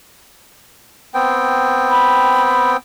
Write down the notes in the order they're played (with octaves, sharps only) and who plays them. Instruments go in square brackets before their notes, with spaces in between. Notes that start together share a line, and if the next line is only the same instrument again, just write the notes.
[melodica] B3 C4 G5
[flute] B5